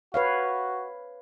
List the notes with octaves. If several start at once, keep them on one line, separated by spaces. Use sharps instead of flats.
F#4 B4 C#5 F5